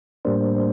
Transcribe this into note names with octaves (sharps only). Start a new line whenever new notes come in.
A2 G3 A#3 D4 C5